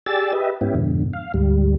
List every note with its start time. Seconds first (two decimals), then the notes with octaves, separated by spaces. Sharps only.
0.06 G4 G#4 D5 E6 A6
0.33 G4 B4 D#5 E5
0.61 G#2 B3 C#4 E4 G4
0.75 F2 G#2 B2 D3
1.13 F5
1.34 D2 G#2 G3